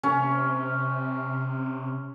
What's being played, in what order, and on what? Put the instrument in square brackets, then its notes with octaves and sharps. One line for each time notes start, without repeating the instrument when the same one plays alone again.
[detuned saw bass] C3 [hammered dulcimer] C#4